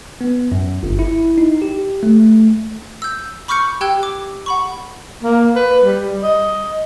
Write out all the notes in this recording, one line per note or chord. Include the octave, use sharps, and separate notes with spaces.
B3
F#2
G1
E4
D#4
G4
A3
E6 G6
B5 C#6 D6 F6 G6 C#7
G4 G5 E6 F#6 G#6 G7
D6
F#5 B5 C#6
A#3
B4
G3
D#5